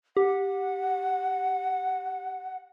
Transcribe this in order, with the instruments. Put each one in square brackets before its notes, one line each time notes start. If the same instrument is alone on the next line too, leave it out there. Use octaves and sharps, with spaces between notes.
[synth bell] G4 [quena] F#5